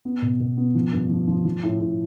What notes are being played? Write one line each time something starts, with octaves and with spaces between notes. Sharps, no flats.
B3
B2
B2
B3
F3
G2
F3
F3
F3
A2
A2